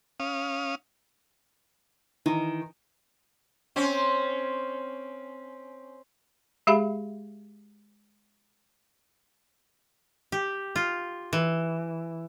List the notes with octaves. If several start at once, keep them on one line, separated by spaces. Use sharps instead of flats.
C#4 F5 D#6
D#3 E3
C4 C#4
G#3 G4 G#4 E5 F5 B5
G4
F4
E3